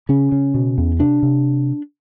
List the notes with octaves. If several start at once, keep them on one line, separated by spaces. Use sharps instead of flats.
C#3 C#4
C#3
B2
E2
C3 D4
C3